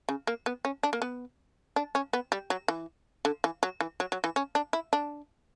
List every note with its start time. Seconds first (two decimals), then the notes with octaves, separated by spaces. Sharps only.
0.09 C#3
0.27 A#3
0.46 B3
0.65 C#4
0.83 D4
0.93 A#3
1.02 B3
1.76 D4
1.95 C#4
2.13 B3
2.32 G3
2.50 F#3
2.68 E3
3.25 D3
3.44 E3
3.63 F#3
3.80 E3
4.00 F#3
4.12 F#3
4.24 E3
4.36 C#4
4.55 D4
4.73 E4
4.93 D4